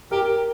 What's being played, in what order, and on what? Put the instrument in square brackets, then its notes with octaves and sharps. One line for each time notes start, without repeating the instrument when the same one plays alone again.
[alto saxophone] G4 [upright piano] A#4